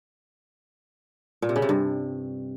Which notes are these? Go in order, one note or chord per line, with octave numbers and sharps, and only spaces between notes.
A#2
C3
C#3
C3
G2